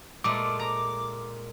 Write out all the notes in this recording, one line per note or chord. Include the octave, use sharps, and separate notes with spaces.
A#2 G#3 A3 D6
A#5